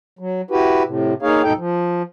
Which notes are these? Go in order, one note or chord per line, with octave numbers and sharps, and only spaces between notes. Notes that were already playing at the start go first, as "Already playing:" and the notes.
F#3
E4 F#4 G4 B4
A2 C3
A#3 D#4 G#4 C#5 F5
D#2 G#2 B2 D#4 A4 G5
F3